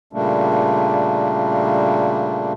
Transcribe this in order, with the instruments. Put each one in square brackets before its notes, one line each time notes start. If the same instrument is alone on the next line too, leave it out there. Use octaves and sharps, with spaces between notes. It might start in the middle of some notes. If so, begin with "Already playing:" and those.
[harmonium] A#2 C#3 G3 A3 A#3 D4